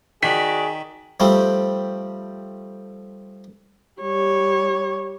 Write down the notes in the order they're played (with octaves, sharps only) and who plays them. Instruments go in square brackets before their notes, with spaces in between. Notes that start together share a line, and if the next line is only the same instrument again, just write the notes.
[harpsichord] D#3 [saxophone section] F#4 D5 [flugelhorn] G#4 [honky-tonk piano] B6
[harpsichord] F3 G3 A3 C4
[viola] G3 C#5